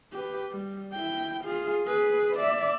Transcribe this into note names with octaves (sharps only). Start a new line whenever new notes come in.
G4 B4
G3
E4 G5
F4 G#4
G#4 B4
D5 E5